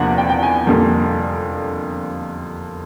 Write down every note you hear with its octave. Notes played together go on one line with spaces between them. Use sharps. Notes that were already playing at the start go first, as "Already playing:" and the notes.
Already playing: E2 C3 F3 A#3 D4 F#5
G5
G5
G#5
F2 D3 G3 A#3